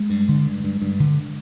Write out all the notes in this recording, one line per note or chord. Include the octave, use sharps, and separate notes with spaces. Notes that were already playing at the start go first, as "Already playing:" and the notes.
Already playing: G#3
G2
D3
G2
G2
G2
D3